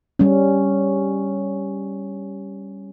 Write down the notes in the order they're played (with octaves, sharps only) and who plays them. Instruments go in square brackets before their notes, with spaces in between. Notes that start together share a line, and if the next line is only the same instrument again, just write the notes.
[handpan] G3 C#4